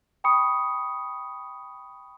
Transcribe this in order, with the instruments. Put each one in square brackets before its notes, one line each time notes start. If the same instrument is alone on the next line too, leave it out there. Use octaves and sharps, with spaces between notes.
[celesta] G5 B5 C#6 D#6 C#7